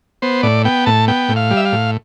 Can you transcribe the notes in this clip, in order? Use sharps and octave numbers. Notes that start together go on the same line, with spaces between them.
B3 C5
A2 D5
B3 G5
A2 A5
B3 G5
A2
F5
G3
E5
F5
A2